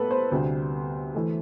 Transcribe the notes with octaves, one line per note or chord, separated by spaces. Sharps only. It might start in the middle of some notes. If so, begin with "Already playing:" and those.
Already playing: A2 G3 B3 A4 B4
C5
D2 C3 G3
E3 A3